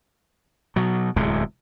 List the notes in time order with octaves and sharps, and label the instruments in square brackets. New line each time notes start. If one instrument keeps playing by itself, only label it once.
[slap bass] B2 F#3
D1 E2 C3 G#3